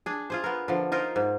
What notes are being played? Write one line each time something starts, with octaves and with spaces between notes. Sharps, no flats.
D4 G#4
F4 G#4 C5
B3 A#4
D3 F3
D#4 F4 A#4 C5
G#2